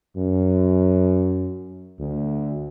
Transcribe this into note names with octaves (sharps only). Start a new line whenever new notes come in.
F#2
D2